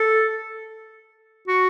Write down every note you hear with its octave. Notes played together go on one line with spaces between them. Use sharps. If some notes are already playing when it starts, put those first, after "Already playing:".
Already playing: A4
F#4